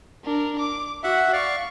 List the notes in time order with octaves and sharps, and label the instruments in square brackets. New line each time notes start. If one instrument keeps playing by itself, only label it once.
[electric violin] D4 A#4
D6
[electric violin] F#4 [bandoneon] E5 F#5
[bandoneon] D5 F5 [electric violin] C#6